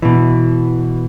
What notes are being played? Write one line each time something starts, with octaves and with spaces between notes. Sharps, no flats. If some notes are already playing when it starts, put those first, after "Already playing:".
B2 E3